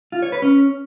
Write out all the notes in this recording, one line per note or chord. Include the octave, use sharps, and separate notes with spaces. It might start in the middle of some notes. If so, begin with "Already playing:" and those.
F4
C#5
B4
C#4